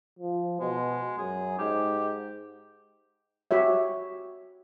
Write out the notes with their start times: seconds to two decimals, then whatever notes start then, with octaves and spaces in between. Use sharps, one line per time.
0.19 F3
0.60 B2 G#3
1.18 F#2 G#4
1.59 G#2 G4
3.51 F#4 G4 C#5 E5